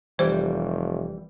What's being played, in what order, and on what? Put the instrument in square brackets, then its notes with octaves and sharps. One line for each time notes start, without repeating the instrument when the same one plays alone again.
[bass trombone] F1 [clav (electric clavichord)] E3 G3 G5 [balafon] C5